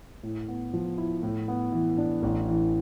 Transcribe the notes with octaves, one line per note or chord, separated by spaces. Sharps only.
A2
B3
F3
E4
A2
B3
E3
D4
A1
E3